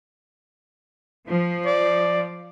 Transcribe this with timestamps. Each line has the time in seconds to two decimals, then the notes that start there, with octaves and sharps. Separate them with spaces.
1.27 F3
1.66 D5